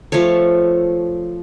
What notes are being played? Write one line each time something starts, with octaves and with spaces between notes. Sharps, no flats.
F3 A3 A4 C#5